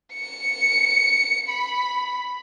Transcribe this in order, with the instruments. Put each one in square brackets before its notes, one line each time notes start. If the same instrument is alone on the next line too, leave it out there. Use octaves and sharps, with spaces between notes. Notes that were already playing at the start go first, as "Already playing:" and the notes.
[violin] C#7
B5